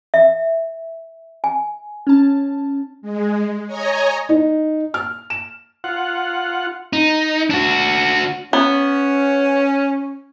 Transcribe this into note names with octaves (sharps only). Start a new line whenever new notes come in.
E5
G#5
C#4 A5
G#3
C#5 D#5 G#5 A#5
D#4
F6
E7
F4 F#5
D#4
D4 F#4
B3 C#4